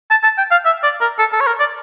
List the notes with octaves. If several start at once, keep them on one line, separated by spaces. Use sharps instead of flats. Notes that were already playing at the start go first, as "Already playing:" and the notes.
A5
A5
G5
F5
E5
D5
A#4
A4
A4
C#5
A#4
D5